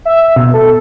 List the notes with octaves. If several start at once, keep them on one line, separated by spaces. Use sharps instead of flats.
E5
B2
A4